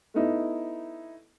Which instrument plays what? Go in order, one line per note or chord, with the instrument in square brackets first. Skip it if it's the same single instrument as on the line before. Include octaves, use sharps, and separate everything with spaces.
[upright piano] A3 B3 D#4 E4